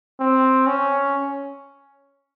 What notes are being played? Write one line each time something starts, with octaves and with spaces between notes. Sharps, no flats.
C4
C#4